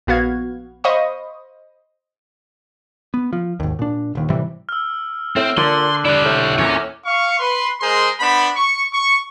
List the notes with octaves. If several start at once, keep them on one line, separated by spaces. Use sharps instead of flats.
A#1 B3 F#4 F5 G#6
C5 D#5 F5 B5 C#6 D#6
B3
F3
G#1 D#2
A#2 D4
D#1 D#2
A2 C3 E3 G3
E6 F6
A2 C4
A#2 D3 C6 F#6 F#7
D4 E4 G4 D6 F#6
A2 F6 G6
E2 A#2 C#4
F5 C#6
B4 C6
G#3 G#4 A#4 C5 C6
B3 D4 C5 B5
C#6
C#6